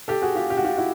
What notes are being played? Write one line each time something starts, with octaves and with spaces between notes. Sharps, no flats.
G4 A4
F#4 G#4
F4 G4
G4
F#4
F4 G4
E4 F#4